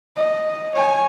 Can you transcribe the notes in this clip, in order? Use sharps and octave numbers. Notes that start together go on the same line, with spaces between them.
D#5
C#5 G#5